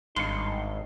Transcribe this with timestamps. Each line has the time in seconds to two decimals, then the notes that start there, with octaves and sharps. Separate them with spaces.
0.16 G#1 G2 D#4 C6 C#6